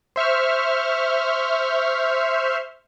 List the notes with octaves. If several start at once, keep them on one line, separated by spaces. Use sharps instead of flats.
C5 E5 C#6 F6